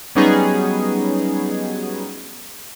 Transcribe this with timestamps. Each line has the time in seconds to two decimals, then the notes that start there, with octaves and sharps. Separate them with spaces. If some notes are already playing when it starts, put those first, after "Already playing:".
0.15 F#3 G3 B3 C#4 D#4 G#4